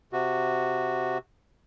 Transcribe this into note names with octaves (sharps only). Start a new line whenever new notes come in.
C3 F#4